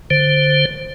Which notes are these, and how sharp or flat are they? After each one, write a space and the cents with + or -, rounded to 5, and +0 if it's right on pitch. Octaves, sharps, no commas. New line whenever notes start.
D3 +0 C5 +0